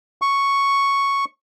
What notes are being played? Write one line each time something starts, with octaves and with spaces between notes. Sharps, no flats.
C#6